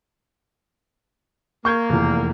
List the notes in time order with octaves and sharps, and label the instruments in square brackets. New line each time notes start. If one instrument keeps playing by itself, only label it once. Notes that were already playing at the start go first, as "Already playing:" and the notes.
[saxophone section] A#3 [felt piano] C#6 G6 G#6
[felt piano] F1 E2